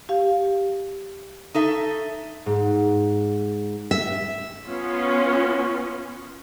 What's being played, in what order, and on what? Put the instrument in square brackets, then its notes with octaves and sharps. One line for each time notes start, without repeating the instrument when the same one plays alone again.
[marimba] G4 F5
[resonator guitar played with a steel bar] D#4 A4 E5
[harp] G#2
[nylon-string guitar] E5
[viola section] B3 C#4 F4